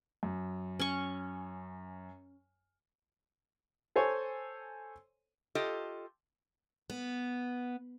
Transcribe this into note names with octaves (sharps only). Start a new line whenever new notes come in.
F#2
C#4 C#6
A4 C5 C#5 G#5
F4 G4 A4 D#5
B3